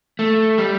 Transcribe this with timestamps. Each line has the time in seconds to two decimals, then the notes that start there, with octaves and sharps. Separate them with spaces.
0.19 A3
0.58 G3